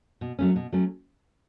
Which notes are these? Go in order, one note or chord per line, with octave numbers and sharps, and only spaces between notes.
B2
F#3 A3 C#4
B2
F#3 A3 C#4